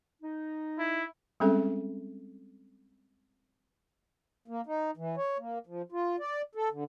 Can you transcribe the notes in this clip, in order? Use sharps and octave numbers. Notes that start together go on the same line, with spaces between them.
D#4
E4
G3 G#3 C4 C#4 G#4 A4
A#3
D#4
E3
C#5
A#3
F3
F4
D5
A4
D3